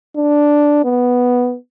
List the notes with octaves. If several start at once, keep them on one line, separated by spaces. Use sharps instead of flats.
D4
B3